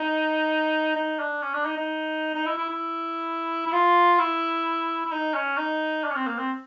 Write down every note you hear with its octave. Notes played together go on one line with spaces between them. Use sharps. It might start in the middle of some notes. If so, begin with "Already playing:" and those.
Already playing: D#4
D#4
D4
C#4
D4
D#4
D#4
D#4
E4
E4
E4
E4
F4
E4
E4
D#4
C#4
D#4
D4
C#4
C4
A#3
C4